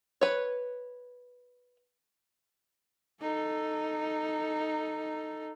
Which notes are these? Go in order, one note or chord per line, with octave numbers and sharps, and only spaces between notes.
B4 C#5
D#4 A4